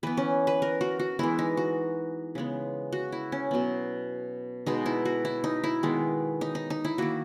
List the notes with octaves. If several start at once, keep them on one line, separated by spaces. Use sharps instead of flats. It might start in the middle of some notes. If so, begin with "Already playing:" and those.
E3 B3 B4
C#4
B4
A#4
F#4
F#4
E3 G#3 B3 E4
D#4
F#4
C#3 G#3 B3
F#4
E4
C#4
B2 F#3 B3
B2 G#3 B3 D#4
E4
F#4
E4
D#4
E4
D#3 G#3 B3
D#4
D#4
D#4
E4
D#3 A#3 F#4